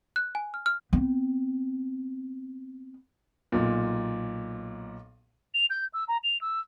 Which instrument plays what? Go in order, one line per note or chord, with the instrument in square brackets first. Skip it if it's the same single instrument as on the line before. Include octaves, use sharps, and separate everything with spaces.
[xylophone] F#6
G#5
F6
F6
[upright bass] B3 C4
[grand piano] B1 A#2
[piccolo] F7
G6
E6
A#5
F7
E6